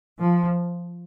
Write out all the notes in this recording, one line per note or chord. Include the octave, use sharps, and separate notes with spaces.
F3